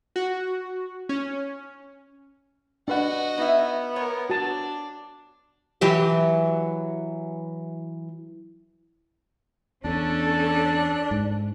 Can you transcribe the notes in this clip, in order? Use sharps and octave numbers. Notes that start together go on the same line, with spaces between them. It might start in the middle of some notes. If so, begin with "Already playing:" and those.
F#4
C#4
D4 F#4 B4 D#5 F#5
B3 D#4 E4 E5
A#4 C#5
D4 F#4 A5
E3 F#3 G4
E2 C#4 D4 A4
G#2